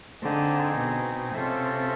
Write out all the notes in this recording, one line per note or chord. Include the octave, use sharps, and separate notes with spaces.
D3 C4 D#4 G#4
B2
C3 C#4 F4 A4 C5 E5